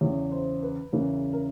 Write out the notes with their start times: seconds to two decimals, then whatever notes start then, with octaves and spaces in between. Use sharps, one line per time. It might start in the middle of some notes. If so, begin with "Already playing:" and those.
0.01 E2 C#3 E3 C#5
0.32 C5
0.63 B4
0.92 E2 C#3 E3 A#4
1.33 A#4